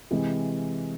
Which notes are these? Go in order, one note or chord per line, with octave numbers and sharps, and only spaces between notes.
C3 E3 G#3